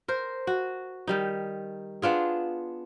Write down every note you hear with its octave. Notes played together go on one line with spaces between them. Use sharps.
A#4 C5
F#4
D#3 G3 D#4
B3 D4 F4 G#4